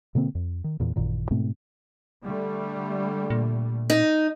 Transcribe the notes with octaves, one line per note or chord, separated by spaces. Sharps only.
B2 D3 A#3 C4
F2
D#3
E2 A#2 E3
A1 F#2 A#2 D#3
G#2 B2 A3 C4
D3 G3 A3
A#2
D#4